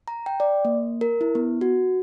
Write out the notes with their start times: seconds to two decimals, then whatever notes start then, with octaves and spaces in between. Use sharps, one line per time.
0.08 A#5
0.26 G5
0.40 D5
0.65 A#3
1.01 A#4
1.21 E4
1.35 B3
1.61 F#4